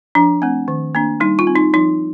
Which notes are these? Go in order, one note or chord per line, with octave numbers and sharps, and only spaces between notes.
F3 D4
A3 C4
D#3
A#3 D4
G3 D#4
F4
C4
D#4
F3 D#4